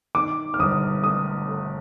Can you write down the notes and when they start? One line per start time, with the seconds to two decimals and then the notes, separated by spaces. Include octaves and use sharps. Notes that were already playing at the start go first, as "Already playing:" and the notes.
0.15 D#3 D6
0.54 F6
0.59 G1 D#6
1.03 A3 D#6
1.49 A3